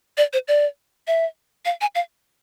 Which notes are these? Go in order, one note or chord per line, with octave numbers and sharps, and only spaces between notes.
D5
C5
D5
E5
F5
G#5
F5